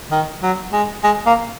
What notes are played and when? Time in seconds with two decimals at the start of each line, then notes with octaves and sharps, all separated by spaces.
0.12 D#3
0.43 F#3
0.73 G#3
1.04 G#3
1.26 A#3